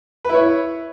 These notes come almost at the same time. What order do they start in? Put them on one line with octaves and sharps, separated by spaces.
B4 E4 C#5